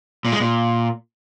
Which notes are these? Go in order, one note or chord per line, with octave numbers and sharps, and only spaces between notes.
A#2
G#3
A#2